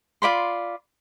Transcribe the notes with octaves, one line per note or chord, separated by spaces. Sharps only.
F4 D5 B5 C6